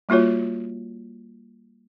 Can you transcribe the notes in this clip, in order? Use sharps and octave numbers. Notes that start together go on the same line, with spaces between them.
G3 A#3 F4 F#4 C#5